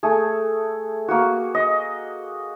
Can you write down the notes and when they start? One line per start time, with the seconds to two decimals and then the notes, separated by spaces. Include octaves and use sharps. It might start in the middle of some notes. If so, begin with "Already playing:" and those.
0.03 A3 G#4
1.08 A#3 F#4
1.55 D#5